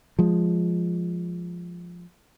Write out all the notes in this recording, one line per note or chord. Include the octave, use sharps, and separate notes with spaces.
F3 G#3